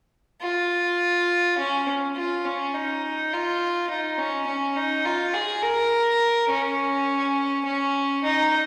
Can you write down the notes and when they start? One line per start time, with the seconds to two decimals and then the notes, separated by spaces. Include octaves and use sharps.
0.41 F4
1.58 C#4
2.16 F4
2.45 C#4
2.74 D#4
3.32 F4
3.90 D#4
4.18 C#4
4.47 C#4
4.76 D#4
5.05 F4
5.34 G#4
5.63 A#4
6.50 C#4
7.66 C#4
8.24 D#4